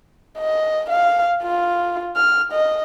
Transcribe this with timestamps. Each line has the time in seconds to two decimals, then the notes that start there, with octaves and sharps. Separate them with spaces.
0.38 D#5
0.90 F5
1.42 F4
2.16 F6
2.52 D#5